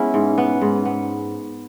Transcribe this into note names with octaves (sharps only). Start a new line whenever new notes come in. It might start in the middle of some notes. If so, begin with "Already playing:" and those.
Already playing: G#3 B3 C#4 E4
G#2
B3
G#2
B3